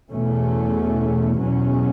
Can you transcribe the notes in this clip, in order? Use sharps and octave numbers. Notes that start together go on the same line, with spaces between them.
E2 B2 A3 C#4
E2 B2 F#3 C#4